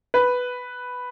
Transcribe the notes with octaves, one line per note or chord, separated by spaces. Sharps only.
B4